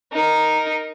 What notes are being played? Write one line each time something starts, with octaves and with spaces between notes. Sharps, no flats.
D#4 A#4